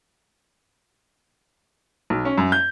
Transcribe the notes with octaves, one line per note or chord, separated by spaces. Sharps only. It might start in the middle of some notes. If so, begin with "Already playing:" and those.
B1
C#4
F#2
G6